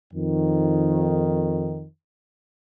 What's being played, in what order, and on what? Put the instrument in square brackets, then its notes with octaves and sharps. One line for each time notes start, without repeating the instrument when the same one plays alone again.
[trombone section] F2 D#3